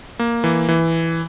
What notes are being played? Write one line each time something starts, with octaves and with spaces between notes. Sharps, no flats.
A#3
E3
E3